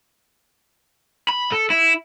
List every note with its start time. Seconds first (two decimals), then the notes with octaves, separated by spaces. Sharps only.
1.29 B5
1.52 A4
1.70 E4